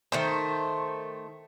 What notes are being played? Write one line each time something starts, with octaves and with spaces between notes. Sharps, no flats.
D#3 A3 C5